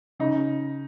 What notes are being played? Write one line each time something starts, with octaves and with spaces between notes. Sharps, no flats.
C#3 D#4